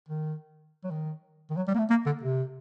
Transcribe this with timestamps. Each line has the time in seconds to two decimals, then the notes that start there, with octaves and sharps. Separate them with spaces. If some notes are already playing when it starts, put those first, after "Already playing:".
0.09 D#3
0.84 F#3
0.91 D#3
1.50 D#3
1.56 F#3
1.67 G3
1.74 A#3
1.78 A3
1.90 A#3
2.06 D3
2.23 C3